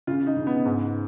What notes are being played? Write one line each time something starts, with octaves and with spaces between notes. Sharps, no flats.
C#3 F4
D#4
C#3
B3
G#2